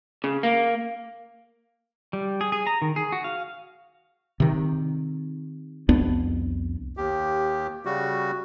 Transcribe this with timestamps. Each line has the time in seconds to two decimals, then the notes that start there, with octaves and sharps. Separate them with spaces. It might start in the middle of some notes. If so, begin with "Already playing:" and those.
0.24 C#3
0.43 A#3
2.13 G3
2.41 G#4
2.52 G#4
2.67 A#5
2.82 D#3
2.96 G#4
3.12 F#4
3.24 F5
4.40 C3 D#3
5.89 C2 F2 B3 D4
6.97 D#2 G4
7.85 C#3 G3 F#4